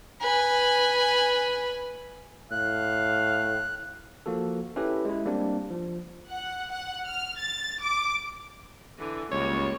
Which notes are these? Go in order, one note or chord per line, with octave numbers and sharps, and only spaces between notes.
B4 G#5
A2 F5 F#6
F3 A#3 F#4 A4
C#4 E4 G4 A4 B4
G#3 E4
G3 A#3 C4 D4
F3
F#5
F#5
F6
A6
D6
D3 E3
C#2 G3 A#3 C#5